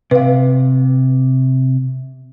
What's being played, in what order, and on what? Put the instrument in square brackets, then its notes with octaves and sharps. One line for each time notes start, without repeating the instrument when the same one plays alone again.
[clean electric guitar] C3 [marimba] B4 F5